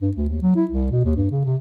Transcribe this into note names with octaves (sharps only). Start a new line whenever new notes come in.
G2
D2
D#2
F#3
E4
C2
B2
D#2
G2
C#3
C3